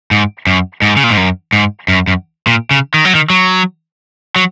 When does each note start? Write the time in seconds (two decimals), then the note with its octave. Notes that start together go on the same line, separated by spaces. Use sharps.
0.11 G#2
0.47 F#2
0.82 G#2
0.96 C#3
1.04 A#2
1.10 G#2
1.17 F#2
1.53 G#2
1.88 F#2
2.07 F#2
2.47 A#2
2.71 C#3
2.94 D#3
3.05 F#3
3.15 D#3
3.30 F#3
4.36 F#3